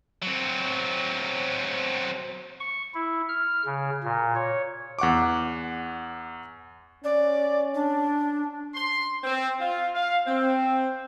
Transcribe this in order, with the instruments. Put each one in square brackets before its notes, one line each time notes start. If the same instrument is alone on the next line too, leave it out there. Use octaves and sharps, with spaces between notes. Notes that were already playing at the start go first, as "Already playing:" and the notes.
[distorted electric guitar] F#3 C4
[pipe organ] C#6
E4
F6
C#3
A#2
C#5
[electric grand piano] E2 F#5 C#6 D6
[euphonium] C#4 [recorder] D5
[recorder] D4
[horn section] C6
C4
F4
F5
C4